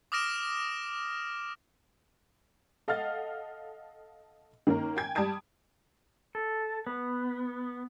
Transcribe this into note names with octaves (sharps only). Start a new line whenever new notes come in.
D6 D#6 F6 A#6 D7 E7
A4 D#5 F5 F#5 F6 A6
D#3 A#3 C#4 A#4
G5 G#5 G#6
G3 A5 D#6 G#6 D7
A4
B3